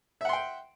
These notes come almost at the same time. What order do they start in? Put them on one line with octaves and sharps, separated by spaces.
E5 F#5 C6 G5